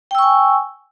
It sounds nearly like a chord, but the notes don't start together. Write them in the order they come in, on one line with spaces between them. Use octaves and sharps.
G5 E6 C#6 G#5